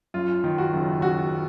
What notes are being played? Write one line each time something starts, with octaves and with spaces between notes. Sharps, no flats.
F#2 F4
D#3
F#4
F#1
F#1 F#4